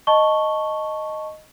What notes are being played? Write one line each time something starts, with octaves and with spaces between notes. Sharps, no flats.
D#5 A5 C#6 G7